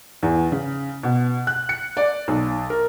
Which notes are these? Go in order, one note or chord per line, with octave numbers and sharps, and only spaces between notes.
E2
C#3
B2
F#6
C#7
D5
B1
A#4